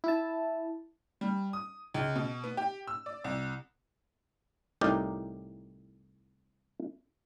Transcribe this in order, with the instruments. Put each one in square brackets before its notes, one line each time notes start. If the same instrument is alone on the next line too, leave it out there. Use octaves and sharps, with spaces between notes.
[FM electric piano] E4 A5
[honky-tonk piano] G3
D#6
C#2
B2
B3
G4
E6
D5
C2
[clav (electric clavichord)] C2 A2 D#4 G4 A#4 D5